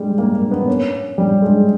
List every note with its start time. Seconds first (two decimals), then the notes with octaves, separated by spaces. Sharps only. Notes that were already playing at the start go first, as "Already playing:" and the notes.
Already playing: G3 G#3
0.18 A#3
0.34 A#3
0.51 B3
0.68 C#4
1.18 G3
1.42 G#3